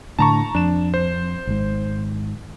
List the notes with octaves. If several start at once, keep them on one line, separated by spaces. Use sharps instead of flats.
A2 D3 A5 A#5 C#6
F2 D4 E7
C5
G#1 G#2